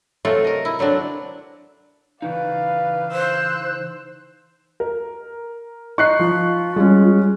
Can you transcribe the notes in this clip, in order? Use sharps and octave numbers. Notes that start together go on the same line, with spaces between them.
C3 F#3 A3 F4 A4
A#4 D#5
E4
D3 F#3 C4 D4
C#3 E3 D#4 B4 D5 F5
C5 E6 F#6
A#4
D#4 C#6 F#6 C7
F3 F4
G3 G#3 C#4